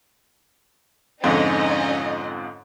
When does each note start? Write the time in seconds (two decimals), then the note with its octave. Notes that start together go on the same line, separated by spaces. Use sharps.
1.24 F2 G#2 D3 C#4 D#4 D#5